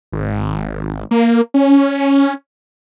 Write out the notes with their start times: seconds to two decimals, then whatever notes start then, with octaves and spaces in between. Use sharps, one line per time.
0.12 G#1
1.11 A#3
1.54 C#4